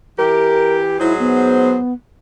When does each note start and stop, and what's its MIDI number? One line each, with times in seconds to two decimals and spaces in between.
0.19 0.99 52
0.19 0.99 67
0.19 0.79 70
1.00 1.77 44
1.00 1.80 54
1.00 1.14 64
1.00 1.80 68
1.00 1.80 72
1.19 1.94 59